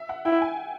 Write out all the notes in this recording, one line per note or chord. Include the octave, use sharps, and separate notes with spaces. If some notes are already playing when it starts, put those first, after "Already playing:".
Already playing: E5
F#5
E4 G5
G#5